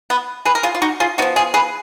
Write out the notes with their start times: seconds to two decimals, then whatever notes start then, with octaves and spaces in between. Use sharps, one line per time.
0.10 B3
0.45 G#4 B4
0.55 A#4
0.63 F4 G#4
0.75 F4
0.82 D#4 F#4
1.00 F4 G#4
1.18 B3 D#4 F#4
1.22 F3
1.36 F4 G#4
1.54 G#4 B4